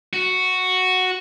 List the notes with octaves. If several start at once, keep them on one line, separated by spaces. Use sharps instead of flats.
F#4